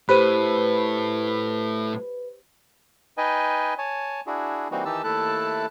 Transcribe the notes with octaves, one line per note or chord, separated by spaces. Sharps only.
A2 G4 B4 C5 D#7
D#4 B4 D#5 G5 G#5
C#5 G#5 A5
D4 E4 F#4 G#4
E3 G3 A#3 C4 D#4 F#4
D#3 E3 D#4 G4 A5 E6
D#2 A3 E4 A4 A5 F#6